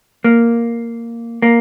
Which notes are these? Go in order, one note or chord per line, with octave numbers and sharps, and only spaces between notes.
A#3
A#3